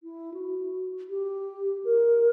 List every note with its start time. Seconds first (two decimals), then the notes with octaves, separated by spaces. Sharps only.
0.03 E4
0.34 F#4
1.09 G4
1.85 A#4